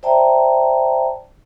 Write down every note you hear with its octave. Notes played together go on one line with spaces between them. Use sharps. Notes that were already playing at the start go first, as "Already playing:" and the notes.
C5 D5 E5 G5 A5 A#5